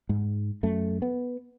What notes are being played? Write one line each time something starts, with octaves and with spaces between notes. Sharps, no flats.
G#2
F#2 A3
B3